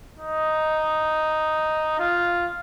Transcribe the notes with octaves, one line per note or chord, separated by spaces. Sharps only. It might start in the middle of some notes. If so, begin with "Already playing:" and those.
D#4
F4